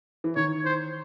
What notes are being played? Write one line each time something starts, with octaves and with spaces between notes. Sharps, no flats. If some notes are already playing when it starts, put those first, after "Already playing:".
E3
D#3 C#5
C5